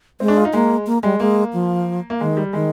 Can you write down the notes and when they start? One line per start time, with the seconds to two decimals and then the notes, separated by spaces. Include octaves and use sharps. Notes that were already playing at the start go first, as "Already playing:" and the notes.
0.20 G#3 C4
0.28 D4
0.37 F4
0.45 D#4
0.53 G#3 A#3
0.87 A#3
1.03 G3 G#3
1.20 G#3 A#3
1.53 F3
2.10 A#3
2.20 D#3 G#3
2.37 G3
2.53 D#3 G#3